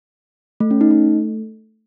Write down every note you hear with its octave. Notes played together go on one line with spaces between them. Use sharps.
A3
C#4
D#4
A3